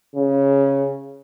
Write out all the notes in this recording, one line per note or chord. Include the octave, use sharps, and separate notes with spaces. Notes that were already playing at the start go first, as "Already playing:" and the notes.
C#3